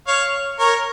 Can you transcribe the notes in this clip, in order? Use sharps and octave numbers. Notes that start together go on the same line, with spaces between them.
C#5 F5
A#4 C#5